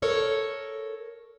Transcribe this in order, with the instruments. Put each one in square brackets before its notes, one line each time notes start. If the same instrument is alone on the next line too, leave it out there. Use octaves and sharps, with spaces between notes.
[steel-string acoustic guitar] A4 A#4 C#5